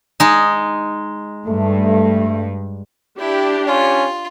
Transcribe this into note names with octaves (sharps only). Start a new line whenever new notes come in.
G#3 D#4
G2 A3
D4 E4 G4
C#4 F4